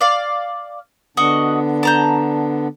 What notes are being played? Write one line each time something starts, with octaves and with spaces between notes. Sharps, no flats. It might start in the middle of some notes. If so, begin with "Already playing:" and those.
D5 F5
D3 B3 D4 F#4 D#5
A5 A#5 G6